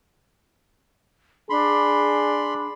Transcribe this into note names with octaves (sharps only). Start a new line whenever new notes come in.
D4 G#4 B5 C6